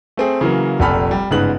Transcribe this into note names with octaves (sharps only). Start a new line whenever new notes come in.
A3 C4 G#4
C#3 E3 F#3 A#3
F1 A#1 A4 G#5 B5 F6
G3
G1 G#2 C#3 B4 F#6 F#7